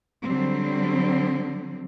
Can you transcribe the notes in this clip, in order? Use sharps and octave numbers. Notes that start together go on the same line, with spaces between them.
D3 F#3 G3 C4